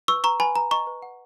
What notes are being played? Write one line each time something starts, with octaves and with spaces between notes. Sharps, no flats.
B4 C#6 E6
B4 A#5 C#6
B4 G#5 B5
B4 A#5
D#5 A#5 C#6
B4
F#5